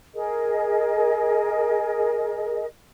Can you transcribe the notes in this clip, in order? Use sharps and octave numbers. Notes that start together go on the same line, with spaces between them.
G#4 A#4 D#5